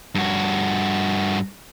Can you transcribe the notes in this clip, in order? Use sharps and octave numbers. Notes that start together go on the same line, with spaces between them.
G2 F#4